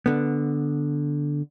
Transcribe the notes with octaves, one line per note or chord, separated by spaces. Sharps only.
D3 B3